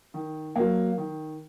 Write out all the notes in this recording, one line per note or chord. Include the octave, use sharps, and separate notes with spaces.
D#3
F#3 A#3
D#3